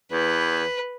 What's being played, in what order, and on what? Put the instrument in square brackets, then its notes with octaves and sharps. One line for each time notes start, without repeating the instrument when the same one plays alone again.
[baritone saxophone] E2 [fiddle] B4